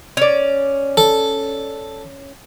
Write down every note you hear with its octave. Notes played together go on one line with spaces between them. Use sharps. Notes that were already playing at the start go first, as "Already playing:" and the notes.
C#4 D5
A4